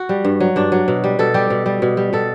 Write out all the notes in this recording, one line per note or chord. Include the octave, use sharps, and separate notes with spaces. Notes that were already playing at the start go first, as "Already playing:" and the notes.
Already playing: F#4
G3
G2
F#3
G2 D4
F#3
B2
G3
B2 A4
G3 G4
B2
G3
B2
G3
B2 A4